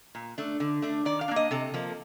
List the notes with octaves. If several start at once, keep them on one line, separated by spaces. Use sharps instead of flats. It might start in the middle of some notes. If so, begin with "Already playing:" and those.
A#2
A3 D4
D3
A3 D4
D#3 D5
F5
A#3 D4
D#5
C3 A4
F3 A#3